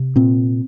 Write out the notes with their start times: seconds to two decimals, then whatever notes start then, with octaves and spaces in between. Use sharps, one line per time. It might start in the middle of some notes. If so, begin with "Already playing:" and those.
Already playing: C3
0.16 A#2 C4